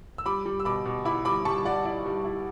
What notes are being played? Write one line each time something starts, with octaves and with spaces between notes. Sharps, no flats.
E6
G3 B5 D6
G3
E6
B2 B5 D6
B2
E4 B5 D6
G3 B5 D6
G3 A5 C#6
G3 D5 F#5
E4 D5
G3
E4